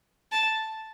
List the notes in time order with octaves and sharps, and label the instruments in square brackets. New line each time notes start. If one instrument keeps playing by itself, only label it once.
[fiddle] A5